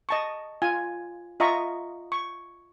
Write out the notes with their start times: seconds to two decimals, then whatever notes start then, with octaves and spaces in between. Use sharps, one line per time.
0.09 D#5 A5 C#6
0.62 F4 G#5
1.40 F4 D#5 E5 A#5 C#6
2.12 C#6